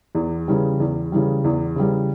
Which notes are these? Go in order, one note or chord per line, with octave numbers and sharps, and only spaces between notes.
E2
C#3 E3 G3
E2
C#3 E3 G3
E2
C#3 E3 G3